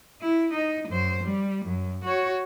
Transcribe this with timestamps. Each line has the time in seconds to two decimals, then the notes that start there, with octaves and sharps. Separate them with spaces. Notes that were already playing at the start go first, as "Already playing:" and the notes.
0.21 E4
0.52 D#4
0.89 F#2 C5
1.24 G3
1.65 F#2
2.04 F#4 C#5